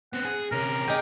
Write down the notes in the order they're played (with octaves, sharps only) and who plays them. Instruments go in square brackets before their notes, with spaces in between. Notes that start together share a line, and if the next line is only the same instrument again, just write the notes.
[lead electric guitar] B3 C4 [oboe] F#5
[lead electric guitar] G#4
[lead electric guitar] C3 C#4 [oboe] A#4
[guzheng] D#4 G4 [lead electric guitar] G#4